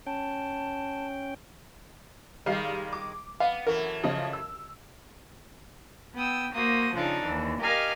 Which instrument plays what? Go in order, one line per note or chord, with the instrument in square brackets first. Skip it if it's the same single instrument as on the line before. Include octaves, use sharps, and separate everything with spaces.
[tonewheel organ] C#4 G5 [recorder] A5
[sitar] D#3 G#3 [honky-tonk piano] G3 F5 C7
[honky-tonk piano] D6
[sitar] B3 [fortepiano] F5
[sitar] F#2 E3 A3 [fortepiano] A#4
[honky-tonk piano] C#3 F3 D#5
E6
[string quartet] B3 G5 D#6 E6
A#3 F#4 C5 D#6
C#3 F3 D4 D#4 A4
D#2 E3
G4 A#4 D#5 F5 G#5 F6